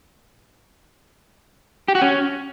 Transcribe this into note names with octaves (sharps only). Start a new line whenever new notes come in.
G4
F#4
C#4